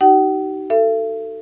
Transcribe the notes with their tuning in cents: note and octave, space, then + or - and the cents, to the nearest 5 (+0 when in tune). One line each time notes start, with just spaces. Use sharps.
D#4 +0 G4 -45 F#5 +45
A4 +20 E5 +40